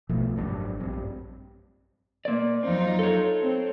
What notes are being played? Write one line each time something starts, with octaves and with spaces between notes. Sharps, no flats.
B1 B2 F3 A3
G#1 F#2 G3 D4
A#1 G2 G3 C4
A#3 D5
F2 F#3 C4 D#4 F4
A4 C#5
C4